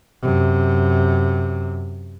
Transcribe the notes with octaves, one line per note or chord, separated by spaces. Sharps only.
F#2 C3